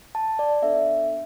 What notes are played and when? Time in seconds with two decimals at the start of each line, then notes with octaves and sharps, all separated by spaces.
0.15 A5
0.39 D5
0.62 B3 D4 A4 E5